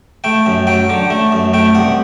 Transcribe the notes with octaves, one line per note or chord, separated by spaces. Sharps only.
A3 G5
F#2
F#3 G5
D3
A3
F#2
A3 G5
C2 F#5